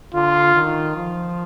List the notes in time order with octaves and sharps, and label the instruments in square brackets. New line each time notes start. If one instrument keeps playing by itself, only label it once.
[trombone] D3 [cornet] F4
[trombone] D#3
F3